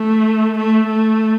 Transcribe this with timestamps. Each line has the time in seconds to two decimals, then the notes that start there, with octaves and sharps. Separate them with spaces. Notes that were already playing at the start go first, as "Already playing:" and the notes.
Already playing: A3
0.57 A3
0.87 A3